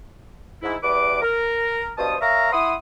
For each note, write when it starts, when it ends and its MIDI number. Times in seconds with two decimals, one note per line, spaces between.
0.62 0.75 44
0.62 0.75 64
0.83 1.20 40
0.83 1.20 55
0.83 1.20 71
0.83 1.20 86
1.21 1.90 70
1.98 2.15 43
1.98 2.15 47
1.98 2.15 72
1.98 2.15 81
1.98 2.15 87
2.21 2.49 70
2.21 2.49 73
2.21 2.49 76
2.21 2.49 77
2.21 2.49 82
2.52 2.73 64
2.52 2.73 78
2.52 2.73 83
2.52 2.73 84
2.52 2.73 87